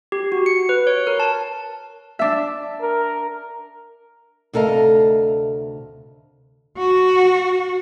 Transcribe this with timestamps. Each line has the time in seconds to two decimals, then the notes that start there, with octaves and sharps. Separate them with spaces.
0.12 G4
0.32 F#4
0.46 C#7
0.69 B4
0.87 C#5
1.07 A#4
1.20 A5
2.19 D4 E5
2.81 A#4
4.53 D2 C3 A4 A#4 D#5 F5
6.77 F#4